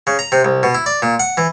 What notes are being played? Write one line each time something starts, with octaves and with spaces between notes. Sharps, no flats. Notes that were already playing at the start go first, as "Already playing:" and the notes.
C#3
A#5
C3
C2
B2
E4
D5
A#2
F#5
E3